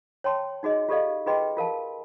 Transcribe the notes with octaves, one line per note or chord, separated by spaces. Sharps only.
C#5 G5 A5 C6
D#4 F#4 G#4 D#5
F4 G4 A4 D5 D#5 F5
F4 G#4 B4 D#5 G5 C6
F4 A#4 F5 A5